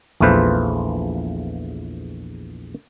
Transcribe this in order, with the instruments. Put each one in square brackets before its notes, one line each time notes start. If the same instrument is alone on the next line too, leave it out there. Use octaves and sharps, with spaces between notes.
[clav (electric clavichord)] A#1 E2 A3 F4 B4 C5